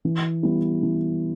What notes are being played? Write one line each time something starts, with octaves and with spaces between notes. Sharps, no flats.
E3
G3 B3 E4
E3